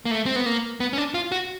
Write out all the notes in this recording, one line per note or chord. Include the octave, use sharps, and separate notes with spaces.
A#3
A3
C4
B3
A#3
B3
C#4
D4
F4
F#4